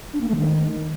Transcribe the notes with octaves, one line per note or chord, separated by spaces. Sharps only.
D4
A#3
A3
D#3